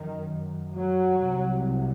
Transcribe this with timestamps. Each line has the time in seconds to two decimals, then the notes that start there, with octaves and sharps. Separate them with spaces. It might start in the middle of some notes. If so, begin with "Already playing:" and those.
Already playing: F#2 D#3
0.75 F#3
1.26 C2 C3